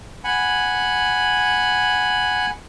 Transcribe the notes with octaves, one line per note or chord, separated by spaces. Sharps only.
F#5 G#5 B5